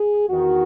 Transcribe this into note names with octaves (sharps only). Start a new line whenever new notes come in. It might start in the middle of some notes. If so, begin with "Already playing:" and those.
Already playing: G#4
E2 D#3 F#4